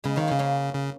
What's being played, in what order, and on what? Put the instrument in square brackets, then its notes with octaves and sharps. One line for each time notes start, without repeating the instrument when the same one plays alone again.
[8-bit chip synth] C#3 [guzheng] G#3 B3
[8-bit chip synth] D#3 [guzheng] A#3 C#4
[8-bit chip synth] C#3 [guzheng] A#3 C#4
[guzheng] A#3 C#4
[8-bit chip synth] C#3